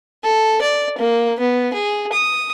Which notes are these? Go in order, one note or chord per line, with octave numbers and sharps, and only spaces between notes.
A4
D5
A#3
B3
G#4
D#6